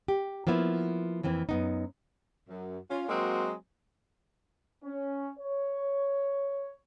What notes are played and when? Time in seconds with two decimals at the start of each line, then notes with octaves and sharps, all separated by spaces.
0.08 G4
0.47 F3 A#3 B3 E4
1.23 F2 E3 A#3 C4
1.49 F#2 B3 D#4
2.49 F#2
2.90 C#4 F4
3.09 F#3 G#3 A#3 C4 F#4
4.83 C#4
5.39 C#5